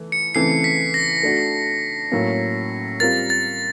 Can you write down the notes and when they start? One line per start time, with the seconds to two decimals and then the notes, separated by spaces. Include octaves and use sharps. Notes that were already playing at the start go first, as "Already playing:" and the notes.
Already playing: E3 A3
0.12 C#7
0.35 C#3 E3 A3 C4 C7
0.64 B6
0.94 A#6
1.23 A3 D4 F#4
2.12 A2 F#3 A#3 C#4
3.00 G3 C4 F4 A#4 A6
3.30 A6